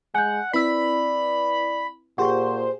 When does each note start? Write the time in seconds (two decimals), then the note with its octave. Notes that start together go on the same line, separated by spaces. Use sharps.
0.14 G#3 F#5 G#5 G6
0.53 C4 E4 B4 D5 B5 E6 B6
2.18 A#2 F4 G4 G#4 C5 F#5 C#6